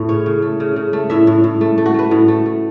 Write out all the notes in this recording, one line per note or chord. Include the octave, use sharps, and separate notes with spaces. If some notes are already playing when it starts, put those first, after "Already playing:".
Already playing: A2 A3
C#3 C#5
C#3
A3
C#3
C#3
A3
A2 E5
A2
A2
A3
A3
F#4
A3 B4
A2
A3
A3